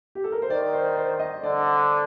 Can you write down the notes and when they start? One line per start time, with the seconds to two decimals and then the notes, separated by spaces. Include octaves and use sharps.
0.15 G4
0.24 A4
0.32 A#4
0.42 C5
0.50 D#3 D5
0.73 C5
0.97 C5
1.19 D#5
1.43 D3 D5